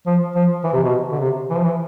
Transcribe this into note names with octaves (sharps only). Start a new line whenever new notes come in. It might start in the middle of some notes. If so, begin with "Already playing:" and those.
F3
F3
E3
C3
B2
D3
C3
E3
F3
E3